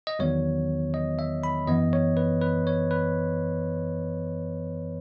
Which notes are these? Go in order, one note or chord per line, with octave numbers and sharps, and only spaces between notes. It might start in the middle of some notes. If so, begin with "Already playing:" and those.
D#5
E2 D#3 F#3 B3 C#5
D#5
E5
B5
F#2 E3 B3 D#5
C#5
B4
B4
C#5
B4